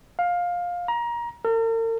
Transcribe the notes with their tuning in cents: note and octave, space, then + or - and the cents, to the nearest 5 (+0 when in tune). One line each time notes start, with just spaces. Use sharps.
F5 +15
A#5 +25
A#4 -45